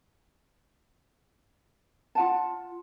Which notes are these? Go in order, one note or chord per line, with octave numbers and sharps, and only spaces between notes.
F4 F#5 A5